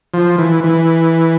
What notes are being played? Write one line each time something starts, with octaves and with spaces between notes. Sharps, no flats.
F3
E3
E3